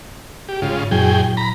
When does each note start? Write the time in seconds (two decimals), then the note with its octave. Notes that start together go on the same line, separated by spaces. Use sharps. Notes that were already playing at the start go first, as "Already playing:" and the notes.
0.48 G4
0.62 G#2 C#3 F4
0.91 F#2 A#2 F#3 E4 G#4 G5
1.37 A#5 B5